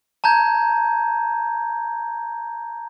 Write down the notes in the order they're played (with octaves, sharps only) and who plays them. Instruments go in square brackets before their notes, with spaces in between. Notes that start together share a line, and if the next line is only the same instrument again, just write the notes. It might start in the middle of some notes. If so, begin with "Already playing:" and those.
[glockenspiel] A5 A#5 G6 G#6